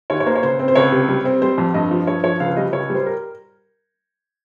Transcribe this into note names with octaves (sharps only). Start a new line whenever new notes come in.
D#2 C#5
C#5
A#3 C5
C#5
C#2 C5
C4
C5
C#2 C#5
C3
G3
C4
G3 C5
F2
G2 D#5
F3
G2 C#5
F3 C#5
C#2 F5
G3 D#5
C#2 C#5
G3 C5
A#4